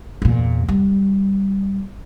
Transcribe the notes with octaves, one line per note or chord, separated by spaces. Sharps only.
E2 A#2
G3